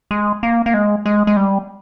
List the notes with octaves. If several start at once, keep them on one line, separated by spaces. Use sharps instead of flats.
G#3
A#3
A#3
G#3
G#3
G#3
G3